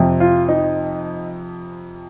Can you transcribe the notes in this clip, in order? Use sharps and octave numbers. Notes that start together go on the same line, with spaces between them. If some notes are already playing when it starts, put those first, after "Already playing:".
Already playing: F2 C3 F3
F4
D#4